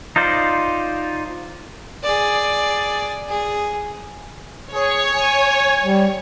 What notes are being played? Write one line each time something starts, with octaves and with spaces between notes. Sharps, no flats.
D#4 F4 C5 D5
G#4 D5
G#4
G#4 C#5
G#5
G3